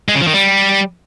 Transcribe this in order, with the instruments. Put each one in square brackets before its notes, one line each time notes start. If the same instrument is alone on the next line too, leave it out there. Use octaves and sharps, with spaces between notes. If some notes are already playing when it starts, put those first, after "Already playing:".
[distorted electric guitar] G#3
C#3
F3
D#3
G3